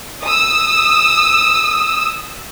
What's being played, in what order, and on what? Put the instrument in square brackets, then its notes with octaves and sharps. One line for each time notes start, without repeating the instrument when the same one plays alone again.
[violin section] D#6 E6